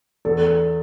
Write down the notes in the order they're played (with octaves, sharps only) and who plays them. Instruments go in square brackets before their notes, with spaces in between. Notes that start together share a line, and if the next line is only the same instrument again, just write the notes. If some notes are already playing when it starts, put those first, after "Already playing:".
[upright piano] E2 [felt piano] A4